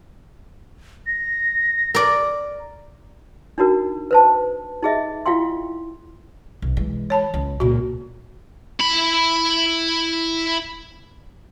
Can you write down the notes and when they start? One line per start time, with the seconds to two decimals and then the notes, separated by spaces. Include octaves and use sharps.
1.07 A#6
1.95 A#4 D5
3.58 D4 D#4 F#4 A#4
4.11 B4 C5 A5
4.83 D#4 G#4 D#5 E5
5.26 E4 F4 F5 G5 C6
6.62 B1
6.77 E3 G#3
7.10 C#5 A5 B5
7.34 C#2
7.60 C#2 A#2 F#4
8.80 E4 B5